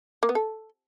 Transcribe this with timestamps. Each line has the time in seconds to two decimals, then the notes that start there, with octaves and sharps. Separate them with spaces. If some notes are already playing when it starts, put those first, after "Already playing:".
0.23 A#3
0.29 B3
0.35 A4